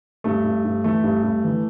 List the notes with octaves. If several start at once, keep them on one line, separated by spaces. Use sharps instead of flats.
G2 A3
G2
G2
E3 A3
G2
G2
E3